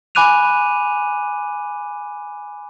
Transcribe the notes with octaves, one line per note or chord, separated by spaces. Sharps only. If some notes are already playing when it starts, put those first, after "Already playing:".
G#5 B5 D6 F#6 D#7 F7